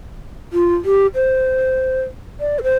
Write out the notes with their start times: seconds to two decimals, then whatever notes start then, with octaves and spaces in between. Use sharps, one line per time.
0.53 F4
0.85 G4
1.15 C5
2.40 D5
2.59 A4
2.63 C5